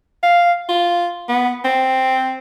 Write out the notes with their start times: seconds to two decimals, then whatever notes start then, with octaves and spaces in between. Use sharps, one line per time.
0.23 F5
0.69 F4
1.29 B3
1.65 C4